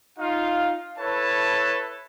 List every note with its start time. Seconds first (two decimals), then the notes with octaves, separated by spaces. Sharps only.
0.19 D#4 F4 F5
0.98 E4 A4 B4 C#5 A5